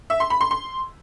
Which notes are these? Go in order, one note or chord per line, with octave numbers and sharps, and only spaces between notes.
E5
C6
B5
C6
C6